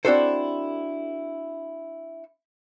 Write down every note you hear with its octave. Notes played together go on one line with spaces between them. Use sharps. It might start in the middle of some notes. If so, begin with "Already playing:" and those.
C4 D4 E4 F#4 A4 C5